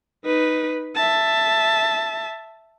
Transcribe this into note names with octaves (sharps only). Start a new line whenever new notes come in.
D#4 B4
E5 A5